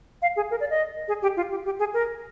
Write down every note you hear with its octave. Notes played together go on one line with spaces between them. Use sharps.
F5
G#4
A#4
D5
D#5
G#4
G4
F4
G4
G4
G#4
A#4